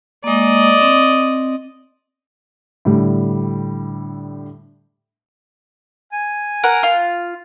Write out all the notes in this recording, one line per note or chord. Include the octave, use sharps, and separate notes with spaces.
G#3 A#3 D5 D#5
C4
A2 D3 G3
G#5
A#4 F#5
F4